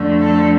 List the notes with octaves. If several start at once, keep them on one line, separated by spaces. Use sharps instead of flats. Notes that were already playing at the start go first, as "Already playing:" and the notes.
Already playing: F2 D3 A3
A4